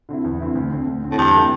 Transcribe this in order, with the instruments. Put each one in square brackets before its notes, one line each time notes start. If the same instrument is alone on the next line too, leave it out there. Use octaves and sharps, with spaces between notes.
[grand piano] D3 C4 E4
E2
D3 C4 E4
D2
D3 C4
D2
D3 C4
[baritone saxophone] A2
[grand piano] E2 [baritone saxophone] G2
[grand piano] D3 A3 C4 E4